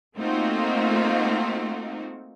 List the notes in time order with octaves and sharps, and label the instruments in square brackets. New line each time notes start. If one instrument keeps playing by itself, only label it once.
[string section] A3 A#3 C4 D#4 F4 F#4